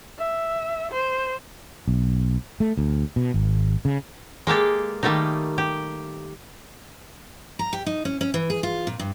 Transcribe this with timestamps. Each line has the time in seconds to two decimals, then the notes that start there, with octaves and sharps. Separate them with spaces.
0.18 E5
0.91 C5
1.88 B1
2.60 A3
2.78 D2
3.16 B2
3.34 G#1
3.85 C#3
4.47 G#3 A#3 G4 A4
5.03 D#3 G3 A3 A#3 D#4
5.58 G4
7.59 A#5
7.73 G4
7.86 D#4
8.05 C#4
8.21 C#4
8.34 E3
8.50 G#4
8.63 F4
8.87 A#2
8.99 G2